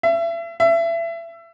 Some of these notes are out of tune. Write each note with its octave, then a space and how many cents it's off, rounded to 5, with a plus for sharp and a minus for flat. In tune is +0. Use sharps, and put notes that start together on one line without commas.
E5 +30
E5 +25